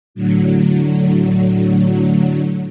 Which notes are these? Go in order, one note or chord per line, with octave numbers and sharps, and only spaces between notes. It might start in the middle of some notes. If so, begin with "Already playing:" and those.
A2 D3 F#3